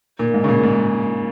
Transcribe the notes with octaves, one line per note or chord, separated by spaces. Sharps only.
A#2
G#2
C#3
A#2
G#2